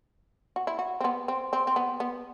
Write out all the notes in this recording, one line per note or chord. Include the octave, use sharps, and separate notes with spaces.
F#4
E4
F#4
C4
B3
C4
C4
C4
B3
B3